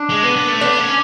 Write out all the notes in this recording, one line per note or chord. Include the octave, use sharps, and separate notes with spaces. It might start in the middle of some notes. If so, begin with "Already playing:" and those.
Already playing: D4
G#3
B3
B3
A3
B3 D4
C#4